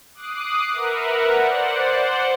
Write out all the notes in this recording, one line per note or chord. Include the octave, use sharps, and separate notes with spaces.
D6 D#6 F#6 C7
A#4 B4 E5 F#5
C5 D5 F#5